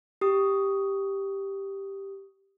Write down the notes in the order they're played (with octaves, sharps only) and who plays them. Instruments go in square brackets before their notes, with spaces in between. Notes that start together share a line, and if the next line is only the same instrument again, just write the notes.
[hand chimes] G4 D#6